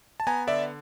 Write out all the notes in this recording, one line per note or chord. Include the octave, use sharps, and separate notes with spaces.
A5
B3 G#5 A#5
D3 D5 E5